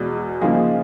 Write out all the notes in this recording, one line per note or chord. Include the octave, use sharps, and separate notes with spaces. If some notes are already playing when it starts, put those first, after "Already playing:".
Already playing: E2 B2 G#3
C#3 F3 A#3 D#4 G#4